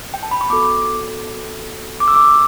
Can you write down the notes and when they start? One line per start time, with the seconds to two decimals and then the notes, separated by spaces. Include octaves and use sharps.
0.14 G5
0.23 A5
0.31 B5
0.41 C#6
0.50 B3 F#4 A4 D6
2.00 D6
2.08 E6
2.15 D6